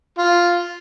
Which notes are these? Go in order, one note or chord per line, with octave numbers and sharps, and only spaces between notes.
F4